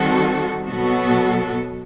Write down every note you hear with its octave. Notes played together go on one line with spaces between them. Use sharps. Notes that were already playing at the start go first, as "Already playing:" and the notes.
Already playing: D#3 G3 C4 F#4 A4
B2 F#3 B3 F#4 A4